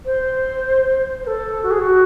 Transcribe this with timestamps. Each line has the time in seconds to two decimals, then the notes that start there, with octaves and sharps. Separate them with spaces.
0.06 C5
1.23 C5
1.27 A4
1.63 F#4
1.71 G#4
1.80 F#4